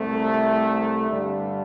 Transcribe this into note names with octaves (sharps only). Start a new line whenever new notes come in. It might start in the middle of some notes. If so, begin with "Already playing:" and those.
Already playing: C2 C3 A3
G2 D3 G3 D4